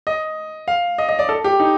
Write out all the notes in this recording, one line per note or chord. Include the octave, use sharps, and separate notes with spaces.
D#5
F5
D#5
D#5
D5
A4
G4
D#4